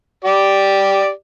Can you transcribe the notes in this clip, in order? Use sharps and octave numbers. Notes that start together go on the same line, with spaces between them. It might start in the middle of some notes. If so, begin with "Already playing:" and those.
G4 D5